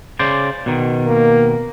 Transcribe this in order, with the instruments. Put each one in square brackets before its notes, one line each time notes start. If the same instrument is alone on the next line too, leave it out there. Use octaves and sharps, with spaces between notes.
[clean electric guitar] C#3 C5 D5
B2 D#3
[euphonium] A#3